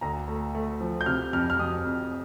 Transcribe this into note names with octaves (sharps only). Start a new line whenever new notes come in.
D2 A#5
A3
A3
F3
G6
C3 F6
F2 F6
F6
F2 D#6
F2